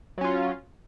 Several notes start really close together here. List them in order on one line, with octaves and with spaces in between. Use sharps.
F#3 C#4 F4